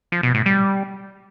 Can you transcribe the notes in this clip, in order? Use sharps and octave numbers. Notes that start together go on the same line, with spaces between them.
F3
B2
A2
G3